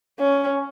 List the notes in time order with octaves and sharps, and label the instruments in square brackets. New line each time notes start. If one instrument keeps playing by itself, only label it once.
[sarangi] C#4